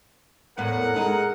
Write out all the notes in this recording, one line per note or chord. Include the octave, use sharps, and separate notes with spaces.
E2 A2 B3 A#4 F#5
G#3 D#4